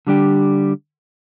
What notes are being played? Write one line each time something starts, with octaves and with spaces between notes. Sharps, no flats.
D3 G3 D4 G4